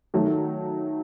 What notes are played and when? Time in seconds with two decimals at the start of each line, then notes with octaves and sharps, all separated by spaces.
0.14 D#3 F#3 A3